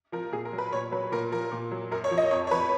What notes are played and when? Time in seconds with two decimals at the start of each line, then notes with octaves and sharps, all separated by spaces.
0.12 F3 A#4
0.32 A#2 G#4
0.45 A#4
0.53 F#3
0.58 B4
0.73 A#2 C#5
0.91 F#3 B4
1.12 A#2 A#4
1.32 F3 A#4
1.52 A#2
1.71 F#3
1.91 F#2 A#4
2.04 C#5
2.11 F3
2.18 D#5
2.31 F2 C#5
2.47 C#5
2.51 F3 B4